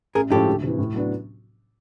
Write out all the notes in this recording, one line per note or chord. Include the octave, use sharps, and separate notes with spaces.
A1 G#4 A#4
A2 F3 G#3 C#4 G4 A4
D2
C3 E3
A2
F#3 B3 D4